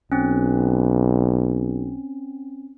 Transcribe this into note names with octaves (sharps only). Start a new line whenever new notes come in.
B1 C4 C#4